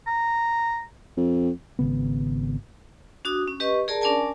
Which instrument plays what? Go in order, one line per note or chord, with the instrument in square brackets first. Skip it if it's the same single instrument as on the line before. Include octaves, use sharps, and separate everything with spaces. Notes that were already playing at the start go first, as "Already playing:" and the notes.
[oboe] A#5
[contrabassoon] F2
[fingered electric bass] G#1 C#3 B3
[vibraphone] D4 F#4 D#6
C#4
G4 B4 D#5 C#6
G#4 A#4 D5 A5 A#5
C#4 D4 A#4 D5 G#5 A5